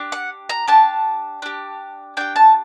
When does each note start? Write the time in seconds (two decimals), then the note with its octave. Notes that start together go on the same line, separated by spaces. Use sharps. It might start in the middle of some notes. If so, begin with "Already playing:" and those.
Already playing: D4 G4
0.12 F#5
0.49 A#5
0.68 D4 G4 A5
1.42 D4 G4
2.17 D4 G4 G5
2.36 A5